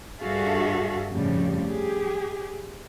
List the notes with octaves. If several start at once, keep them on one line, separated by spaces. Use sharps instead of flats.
G2 F#4 G#4 A4 E5 F5
F2 A2 C#3 F3 G3
G4 G#4